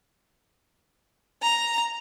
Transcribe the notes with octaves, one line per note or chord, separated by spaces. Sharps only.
A#5